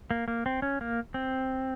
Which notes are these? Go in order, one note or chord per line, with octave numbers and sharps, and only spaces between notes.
A#3
A#3
C4
C#4
A#3
C4